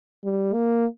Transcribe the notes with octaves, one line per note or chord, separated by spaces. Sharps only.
G3
A#3